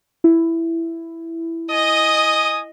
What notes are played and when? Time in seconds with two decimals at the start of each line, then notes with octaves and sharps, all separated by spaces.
0.24 E4
1.71 D#5 G#5 D#6